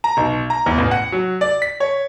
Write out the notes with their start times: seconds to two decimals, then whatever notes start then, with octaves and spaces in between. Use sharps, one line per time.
0.04 A#5
0.17 B1
0.50 A#5
0.66 E2
0.78 A1
0.91 F#5
1.12 F#3
1.41 D5
1.62 B6
1.80 C#5